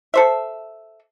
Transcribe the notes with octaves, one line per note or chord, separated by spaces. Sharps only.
A4 C5 E5